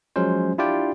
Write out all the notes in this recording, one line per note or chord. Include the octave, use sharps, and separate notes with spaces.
F3 F#3 G#3 C#4 C5
D4 E4 F4 G4 D5 G5